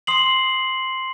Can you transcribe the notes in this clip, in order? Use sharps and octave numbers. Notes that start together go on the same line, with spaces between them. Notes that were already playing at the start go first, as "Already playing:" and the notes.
C6 D#6 C7 F#7